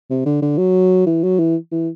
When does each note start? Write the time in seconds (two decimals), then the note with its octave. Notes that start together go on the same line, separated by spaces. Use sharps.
0.10 C3
0.26 D3
0.42 D3
0.58 F#3
1.06 E3
1.24 F#3
1.39 E3
1.72 E3